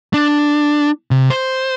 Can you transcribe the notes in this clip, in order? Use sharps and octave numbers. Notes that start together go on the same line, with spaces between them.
D4
C3
C5